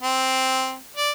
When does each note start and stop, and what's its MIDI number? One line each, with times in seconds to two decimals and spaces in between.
0.03 0.76 60
0.97 1.11 74